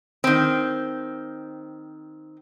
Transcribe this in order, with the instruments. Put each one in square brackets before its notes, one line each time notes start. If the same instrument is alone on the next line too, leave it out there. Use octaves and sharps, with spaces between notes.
[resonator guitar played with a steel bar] D#3 C4